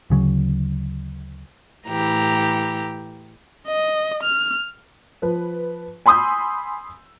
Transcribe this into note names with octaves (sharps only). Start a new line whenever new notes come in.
D2 C#3 F#3
A2 E3 G4 A#5
D#5
F6
F3 B4
G#5 B5 C6 D#6 E6 G6